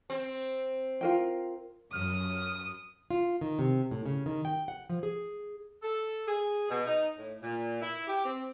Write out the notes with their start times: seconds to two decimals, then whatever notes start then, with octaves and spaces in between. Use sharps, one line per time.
0.10 C4
1.01 F4 A#4 G5
1.93 F#2 D#6 F6
3.11 F4
3.41 D#3
3.59 C3
3.91 A2
4.06 C#3
4.26 D#3
4.45 G5
4.68 F#5
4.89 F3
5.03 G#4
5.83 A4
6.27 G#4
6.69 B2
6.86 D#4
7.17 A2
7.41 A#2
7.81 E4
8.07 G4
8.25 C4